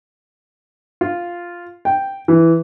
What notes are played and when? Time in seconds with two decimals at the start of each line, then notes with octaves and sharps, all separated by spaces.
1.01 F4
1.85 G5
2.28 E3